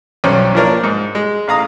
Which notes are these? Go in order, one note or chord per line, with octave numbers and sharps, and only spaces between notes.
B1 G2 C#4 C5
F3 A#3 D4 A#4 C#5
G#2
G#3
A1 F5 A#5 D#6